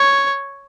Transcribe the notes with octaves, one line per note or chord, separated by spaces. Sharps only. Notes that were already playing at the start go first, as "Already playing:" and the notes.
Already playing: C#5